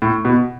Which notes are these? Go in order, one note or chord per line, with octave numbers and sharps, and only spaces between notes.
A2
B2